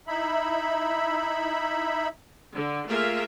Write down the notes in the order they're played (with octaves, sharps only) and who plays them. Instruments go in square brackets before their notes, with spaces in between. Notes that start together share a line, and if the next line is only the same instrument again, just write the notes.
[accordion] D#4 E4 E5 B5
[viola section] D3
A3 A#3 F4 G#4 A#4 E5